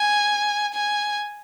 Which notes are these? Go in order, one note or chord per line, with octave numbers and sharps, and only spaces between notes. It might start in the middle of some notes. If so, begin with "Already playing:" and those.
Already playing: G#5
G#5